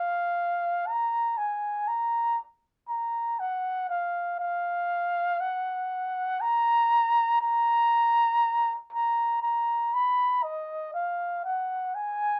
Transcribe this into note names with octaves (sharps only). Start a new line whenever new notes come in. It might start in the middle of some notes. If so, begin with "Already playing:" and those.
Already playing: F5
A#5
G#5
A#5
A#5
F#5
F5
F5
F#5
A#5
A#5
A#5
A#5
B5
D#5
F5
F#5
G#5